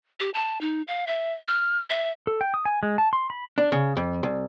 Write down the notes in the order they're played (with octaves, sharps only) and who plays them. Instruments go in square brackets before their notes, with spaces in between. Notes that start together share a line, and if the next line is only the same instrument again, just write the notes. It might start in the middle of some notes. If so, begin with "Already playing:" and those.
[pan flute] G4
A5
D#4
F5
E5
F6
E5
[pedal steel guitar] A4
G5
D#6
G#5
G#3
A5
C6
B5
[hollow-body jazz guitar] D4
C#3
F2
C2